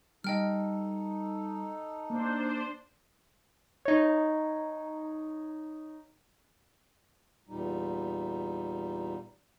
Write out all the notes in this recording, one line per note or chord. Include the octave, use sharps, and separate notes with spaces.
G3 D#4 A4 D#5 G5 F6
A#3 D4 C5
D#4 C#5
E2 A#2 G3 D#4